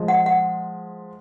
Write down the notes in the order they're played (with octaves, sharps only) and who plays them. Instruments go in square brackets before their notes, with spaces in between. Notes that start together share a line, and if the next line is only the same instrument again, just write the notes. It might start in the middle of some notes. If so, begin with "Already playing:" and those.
Already playing: [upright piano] F3 G#3
[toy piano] F#5
F#5